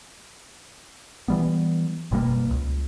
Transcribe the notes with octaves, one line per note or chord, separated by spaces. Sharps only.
E3 G3 B3
F#1 B2 G3 A#3
C#2